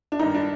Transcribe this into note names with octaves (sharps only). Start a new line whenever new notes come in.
D4
G2 D#3 D#4
D4